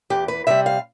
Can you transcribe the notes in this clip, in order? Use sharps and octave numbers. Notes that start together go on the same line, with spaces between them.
E2 G4
B4
C3 G3 E5
F5